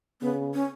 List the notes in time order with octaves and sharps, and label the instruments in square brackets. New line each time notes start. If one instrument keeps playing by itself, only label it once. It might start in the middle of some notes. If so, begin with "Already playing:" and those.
[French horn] C#3 [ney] B3
[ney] C#4